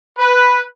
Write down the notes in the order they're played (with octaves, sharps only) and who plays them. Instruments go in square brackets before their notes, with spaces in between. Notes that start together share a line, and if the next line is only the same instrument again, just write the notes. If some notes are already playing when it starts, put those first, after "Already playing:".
[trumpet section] B4